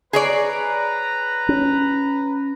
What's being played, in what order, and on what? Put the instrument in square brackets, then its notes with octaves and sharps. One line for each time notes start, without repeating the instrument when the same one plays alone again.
[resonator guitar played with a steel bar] G#4 C#5 D5 [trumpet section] B4 A#5
[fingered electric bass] C#4